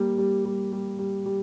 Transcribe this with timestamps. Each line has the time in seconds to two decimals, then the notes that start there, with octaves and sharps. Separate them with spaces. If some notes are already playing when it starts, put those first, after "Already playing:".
Already playing: G3 A#3
0.18 G3
0.45 G3
0.72 G3
0.99 G3
1.26 G3